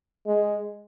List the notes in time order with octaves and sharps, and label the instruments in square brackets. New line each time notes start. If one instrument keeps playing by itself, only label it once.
[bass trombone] G#3